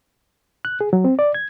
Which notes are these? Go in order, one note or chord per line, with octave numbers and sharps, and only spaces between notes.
F#6
G#4
F#3
C4
D5
G#6